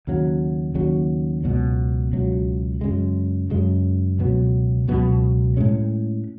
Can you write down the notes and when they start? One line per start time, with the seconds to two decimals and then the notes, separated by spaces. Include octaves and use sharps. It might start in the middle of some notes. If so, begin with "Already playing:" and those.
0.07 D#2 C#3 F#3
0.75 D#2 C#3 F#3
1.44 C#2 B2 F#3
2.13 C#2 B2 F#3
2.81 F#2 C#3 G#3
3.50 F#2 C#3 G#3
4.19 C#2 B2 F#3 B3
4.87 C#2 B2 F#3 B3
5.57 A2 G#3 C#4